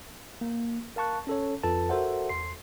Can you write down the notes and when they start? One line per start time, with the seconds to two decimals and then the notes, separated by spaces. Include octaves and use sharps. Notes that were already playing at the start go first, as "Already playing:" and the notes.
0.41 A#3
0.96 A#4 F5 A5 C#6 F#6
1.27 C#4 A4 C#5
1.63 F2 F4 A4 B4 A5
1.89 F#4 A4 A#4 C5 E5 F#5
2.29 E2 C6 C7